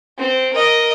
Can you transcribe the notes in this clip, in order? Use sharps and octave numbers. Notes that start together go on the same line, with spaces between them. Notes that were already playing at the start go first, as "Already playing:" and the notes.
C4
A#4 D#5